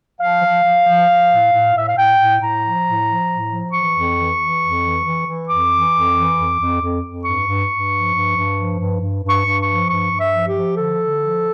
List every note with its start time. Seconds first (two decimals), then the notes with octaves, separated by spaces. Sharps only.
0.20 F3 F5
0.43 F3
0.64 F3
0.87 F3
1.09 F3
1.30 A2
1.53 A2
1.74 A2 E5
1.87 F5
1.96 A2 G5
2.19 A2
2.41 A2 A#5
2.63 F3
2.85 A2
3.06 F3
3.30 A2
3.50 F3
3.73 E3 C#6
3.95 F2
4.17 E3
4.39 E3
4.61 F2
4.83 E3
5.05 E3
5.27 E3
5.48 F2 D6
5.71 E3
5.93 F2
6.15 E3
6.37 F2
6.59 F2
6.81 F2
7.03 F2
7.25 G2 C#6
7.46 G2
7.69 G2
7.91 F3
8.13 G2
8.35 G2
8.56 F3
8.78 G2
9.01 G2
9.23 G2
9.30 C#6
9.44 G2
9.60 C#6
9.66 F3
9.89 G2 C#6
10.10 G2
10.18 E5
10.32 F3
10.48 G4
10.55 F3
10.76 D3 A4
10.99 D3
11.20 F3